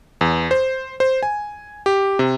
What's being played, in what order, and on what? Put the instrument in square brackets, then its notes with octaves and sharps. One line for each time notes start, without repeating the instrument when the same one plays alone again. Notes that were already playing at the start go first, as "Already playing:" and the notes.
[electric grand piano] E2
C5
C5
G#5
G4
C3